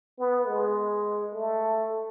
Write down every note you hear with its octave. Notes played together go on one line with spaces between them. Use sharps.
B3
G#3
A3